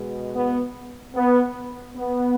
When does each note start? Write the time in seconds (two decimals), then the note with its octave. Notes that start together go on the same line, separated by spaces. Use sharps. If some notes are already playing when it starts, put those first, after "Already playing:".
Already playing: B2 G#3
0.34 B3
1.15 B3
1.96 B3